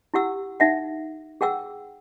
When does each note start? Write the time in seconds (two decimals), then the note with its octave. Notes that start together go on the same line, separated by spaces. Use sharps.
0.14 E4 G4 F#5 E6
0.60 D#4 E5 F#5
1.41 G#4 F#5 G5 E6